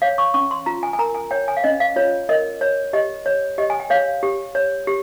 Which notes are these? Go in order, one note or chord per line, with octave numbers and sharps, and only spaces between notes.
C#5 F5
C#6
C#4 C#6
C6
F4 A#5
G#5
G#5
A#4 A#5
G#5
C#5 G5
G#5
F5
C#4 D#5
F5
F4 C#5
A#4 D#5
C#5
G4 D#5
C#5
G4 D#5
G#5
G5
C#5 F5
G4
C#5
G4